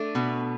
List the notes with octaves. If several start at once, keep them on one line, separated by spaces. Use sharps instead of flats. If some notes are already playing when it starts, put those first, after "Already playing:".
Already playing: A3 D4
B2